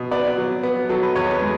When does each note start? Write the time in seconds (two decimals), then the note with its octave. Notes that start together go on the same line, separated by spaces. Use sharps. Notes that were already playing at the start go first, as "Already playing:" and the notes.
Already playing: B2
0.11 B3 D5
0.38 F#3
0.63 B3
0.89 F#3 A4
1.03 B4
1.16 E2 C#5
1.33 B4
1.42 G#3